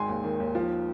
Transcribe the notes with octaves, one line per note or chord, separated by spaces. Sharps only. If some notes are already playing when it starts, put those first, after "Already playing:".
Already playing: G#1 G#3 G#5 C6
D#2
D#3
D#2
F3